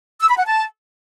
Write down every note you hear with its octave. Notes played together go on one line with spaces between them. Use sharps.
E6
B5
F#5
A5